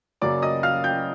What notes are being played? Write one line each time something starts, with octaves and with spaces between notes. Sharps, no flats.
F#2 C#3 F#3 A#3 D5 D6
D#5 D#6
F5 F6
G5 G6